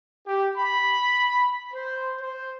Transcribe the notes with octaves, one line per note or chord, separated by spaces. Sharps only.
G4
B5
C5
C5